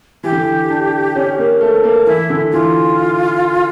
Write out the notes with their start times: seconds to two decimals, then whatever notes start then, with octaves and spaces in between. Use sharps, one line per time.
0.23 E3 G4
0.32 D3
0.40 E3
0.70 D4
1.16 C#4
1.38 A#3
1.61 A3
1.84 A#3
2.06 E3 E4
2.30 D3
2.52 E3 F4